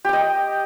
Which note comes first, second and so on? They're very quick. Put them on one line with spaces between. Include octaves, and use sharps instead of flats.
G4 G5 D#5